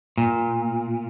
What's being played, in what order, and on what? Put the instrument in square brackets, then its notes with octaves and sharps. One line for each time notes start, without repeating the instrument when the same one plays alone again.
[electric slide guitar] A#2